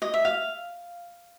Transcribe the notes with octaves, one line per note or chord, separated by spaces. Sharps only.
D#5
E5
F5